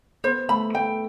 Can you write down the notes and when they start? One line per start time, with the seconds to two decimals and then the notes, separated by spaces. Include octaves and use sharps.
0.24 B3 C5
0.49 A3 B5
0.74 A3 G5